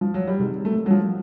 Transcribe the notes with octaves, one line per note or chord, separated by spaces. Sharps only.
F3
F#3
G3
C3 D#3 G#3
A3
F#3
F3